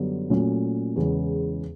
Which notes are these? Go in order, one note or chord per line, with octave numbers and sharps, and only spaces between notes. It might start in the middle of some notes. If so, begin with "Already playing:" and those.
Already playing: F#2 D3 G3 B3 D4
A#2 F#3 A3 C#4
E2 C#3 E3 G#3